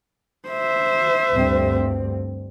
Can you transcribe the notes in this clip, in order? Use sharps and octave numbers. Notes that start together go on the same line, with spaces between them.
C5 E5
D2 G2 C4